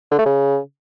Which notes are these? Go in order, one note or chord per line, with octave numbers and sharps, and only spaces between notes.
D3
A3
C#3